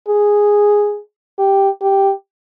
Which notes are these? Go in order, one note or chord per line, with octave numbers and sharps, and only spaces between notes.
G#4
G4
G4